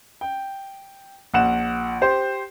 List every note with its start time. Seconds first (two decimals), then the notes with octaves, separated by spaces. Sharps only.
0.21 G5
1.34 A#1 F#5 E7
2.01 G4 C5